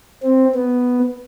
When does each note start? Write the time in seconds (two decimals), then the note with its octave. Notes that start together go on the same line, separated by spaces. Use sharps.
0.23 C4
0.54 B3